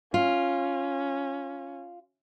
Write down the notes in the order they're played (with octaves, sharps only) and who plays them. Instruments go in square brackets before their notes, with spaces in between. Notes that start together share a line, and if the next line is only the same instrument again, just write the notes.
[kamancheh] C#4 [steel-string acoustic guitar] F4